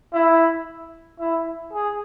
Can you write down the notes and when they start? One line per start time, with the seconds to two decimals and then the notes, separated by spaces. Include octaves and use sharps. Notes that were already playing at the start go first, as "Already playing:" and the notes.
0.13 E4
1.19 E4
1.73 G#4